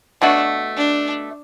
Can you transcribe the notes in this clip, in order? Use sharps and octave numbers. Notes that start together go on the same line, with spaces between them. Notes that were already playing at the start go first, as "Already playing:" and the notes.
B2 A3 D4 F#4
D4